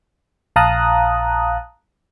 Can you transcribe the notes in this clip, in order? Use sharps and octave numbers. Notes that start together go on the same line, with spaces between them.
A#1 F5 A5 A#5 D#6 F#6